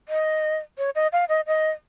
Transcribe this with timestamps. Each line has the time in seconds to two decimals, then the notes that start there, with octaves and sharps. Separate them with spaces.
0.09 D#5
0.78 C#5
0.95 D#5
1.13 F5
1.29 D#5
1.47 D#5